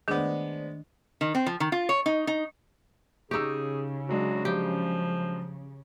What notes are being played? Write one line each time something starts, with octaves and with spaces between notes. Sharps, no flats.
D#3 G#3 A3 B3 D4 C5 D5
D#3
C4
F3
D#3
F4
C#5
D#4
D#4
C#3 D#4 G4 G#4 C#6 E6
F#3 G#3 D4 F#4
F3 G4